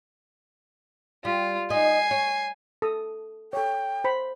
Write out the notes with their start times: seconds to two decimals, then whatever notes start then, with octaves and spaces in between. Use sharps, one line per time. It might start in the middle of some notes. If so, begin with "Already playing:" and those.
1.25 G3 F4
1.70 D#4 G#5 C7
2.11 C#5
2.82 A4 D#6
3.53 A4 C#5 G5
4.04 C5 B5